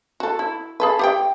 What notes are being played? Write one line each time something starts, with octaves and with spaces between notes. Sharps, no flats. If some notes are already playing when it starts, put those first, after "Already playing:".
F#4 A4
E4
G#4 A4 B4
G4 F#5 G5